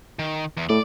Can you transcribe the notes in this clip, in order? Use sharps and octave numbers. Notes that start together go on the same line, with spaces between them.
D#3
E2
A2 D5